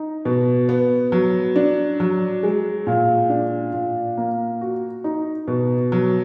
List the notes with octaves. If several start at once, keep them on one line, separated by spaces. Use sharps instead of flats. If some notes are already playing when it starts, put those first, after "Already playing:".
Already playing: D#4
B2
B3
F#3
D4
F#3
G#3
A#2
D4
A#2
A#3
F#4
D#4
B2
F#3